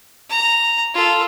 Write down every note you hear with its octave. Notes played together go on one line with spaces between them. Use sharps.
A#5
F4 A4